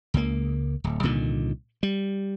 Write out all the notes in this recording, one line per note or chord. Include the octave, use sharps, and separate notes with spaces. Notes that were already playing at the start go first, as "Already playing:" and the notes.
C#2 A#3
D1
C2 A#2 D3 D#3
G3